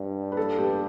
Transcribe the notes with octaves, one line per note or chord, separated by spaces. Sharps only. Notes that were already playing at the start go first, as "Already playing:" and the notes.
Already playing: G2
B4
A4
G4